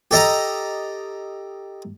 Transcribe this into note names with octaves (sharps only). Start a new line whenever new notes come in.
G4 A4 D#5 A#5